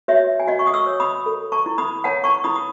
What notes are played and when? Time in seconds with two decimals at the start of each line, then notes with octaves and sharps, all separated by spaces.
0.08 F#4 C#5 E5
0.40 G#5
0.47 F#4 D#5 F#5
0.59 C#6
0.67 D#6
0.74 C#6 E6
0.87 C#5
1.00 B5 D#6
1.26 A4
1.52 A5 C#6
1.66 E4
1.78 B5 D#6
2.04 C#5 F#5 A5
2.24 A5 C#6
2.44 E4 B5 D#6
2.55 D#6